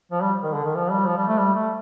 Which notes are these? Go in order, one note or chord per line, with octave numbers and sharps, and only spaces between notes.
F3
G3
D#3
D3
D#3
F3
G3
F3
G3
A3
G3
A3